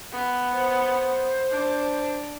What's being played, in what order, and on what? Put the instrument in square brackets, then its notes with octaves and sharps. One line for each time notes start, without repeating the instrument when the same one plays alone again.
[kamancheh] B3
[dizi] C5
[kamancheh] D4